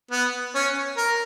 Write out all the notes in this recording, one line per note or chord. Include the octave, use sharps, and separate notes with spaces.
B3
C#4
A#4